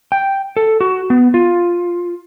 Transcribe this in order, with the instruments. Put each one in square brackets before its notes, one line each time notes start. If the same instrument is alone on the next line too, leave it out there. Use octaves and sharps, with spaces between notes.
[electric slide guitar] G5
A4
F#4
B3
F4